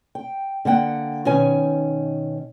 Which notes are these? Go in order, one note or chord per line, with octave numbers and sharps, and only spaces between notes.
G5
D3 A#3 F#5 G5
B2 D#3 C#4 G#5